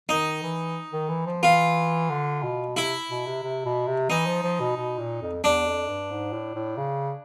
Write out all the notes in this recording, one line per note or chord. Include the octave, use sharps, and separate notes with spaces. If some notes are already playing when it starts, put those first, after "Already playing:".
D#3 D#4
E3
D#3
E3
F3
E3 F4
D3
B2
C3 E4
B2
C3
C3
B2
C3
E3 D#4
F3
F3
B2
B2
A#2
F2
E2 D4
F2
G2
G#2
A2
A2
C#3